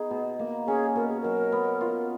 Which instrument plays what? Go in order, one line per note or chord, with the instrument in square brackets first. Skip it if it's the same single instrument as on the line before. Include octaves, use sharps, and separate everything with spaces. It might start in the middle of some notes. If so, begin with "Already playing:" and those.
Already playing: [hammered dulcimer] B3 D#4 [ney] G#4
[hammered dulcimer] B2
A#3
[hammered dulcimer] C#4 [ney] G#4
[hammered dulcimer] B2 [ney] A#4
[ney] G#4
[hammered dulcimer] F#3 [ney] A#4
[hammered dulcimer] B3
F4